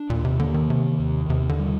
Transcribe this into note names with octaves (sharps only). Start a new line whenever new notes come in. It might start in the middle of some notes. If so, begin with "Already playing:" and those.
Already playing: D4
D#2 A#2
C3
D3 A#3
D#3
C3 D#3
D#2
D#2 C3
D3
G3